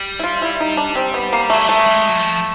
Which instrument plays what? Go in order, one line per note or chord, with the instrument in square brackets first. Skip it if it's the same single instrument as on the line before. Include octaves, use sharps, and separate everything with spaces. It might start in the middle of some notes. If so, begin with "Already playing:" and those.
Already playing: [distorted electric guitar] G3
[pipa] E4
F4
E4
D#4
D4
C4
B3
A#3
[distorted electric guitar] F#3 [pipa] A3
[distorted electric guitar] G3
[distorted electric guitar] G#3 [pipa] A3
[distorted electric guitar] G3
G#3
F#3
F3